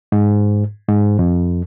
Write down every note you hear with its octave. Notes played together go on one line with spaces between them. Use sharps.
G#2
G#2
F2